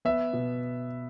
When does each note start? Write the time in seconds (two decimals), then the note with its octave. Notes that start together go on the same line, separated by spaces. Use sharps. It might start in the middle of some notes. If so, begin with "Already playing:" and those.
0.05 B3 E5
0.33 B2